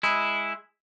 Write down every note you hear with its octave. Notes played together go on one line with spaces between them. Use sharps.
G#3 E4